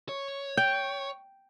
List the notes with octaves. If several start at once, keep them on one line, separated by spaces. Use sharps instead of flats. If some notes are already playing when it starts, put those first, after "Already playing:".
C#5
G5